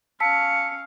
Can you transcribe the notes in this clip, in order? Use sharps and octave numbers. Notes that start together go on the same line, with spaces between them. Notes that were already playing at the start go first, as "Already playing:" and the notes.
C#4 F5 A5 E6 B6 C#7